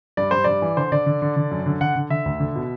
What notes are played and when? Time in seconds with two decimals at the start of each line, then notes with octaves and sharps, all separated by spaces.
0.17 G2 D5
0.31 G2 C5
0.44 G2 D5
0.62 E3
0.77 D3 C5
0.92 D3 D5
1.06 D3
1.22 D3
1.36 D3
1.51 F#2
1.66 D3
1.81 D3 F#5
1.96 D3
2.10 D3 E5
2.26 D2
2.40 D3
2.55 B2